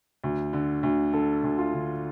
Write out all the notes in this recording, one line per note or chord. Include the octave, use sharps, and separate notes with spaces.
D2
D3
D2
D3 A4
D2
F4
D3